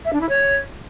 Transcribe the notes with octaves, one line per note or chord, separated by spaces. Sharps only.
E5
D4
E4
C#5